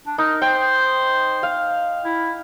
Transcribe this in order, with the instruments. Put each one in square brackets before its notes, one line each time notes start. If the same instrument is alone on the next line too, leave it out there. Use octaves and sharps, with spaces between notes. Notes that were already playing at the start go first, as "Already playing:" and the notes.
[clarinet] D4
[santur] D#4 [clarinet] A#4
[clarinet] C5 [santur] G5
[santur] F5
[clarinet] E4